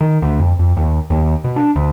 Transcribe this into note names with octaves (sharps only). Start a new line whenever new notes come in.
D#3
D2
F2
F2
D#2
D#2
B2
D4
D2